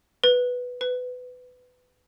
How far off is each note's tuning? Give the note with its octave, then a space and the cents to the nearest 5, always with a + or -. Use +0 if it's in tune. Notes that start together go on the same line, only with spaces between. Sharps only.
B4 +0
B4 +20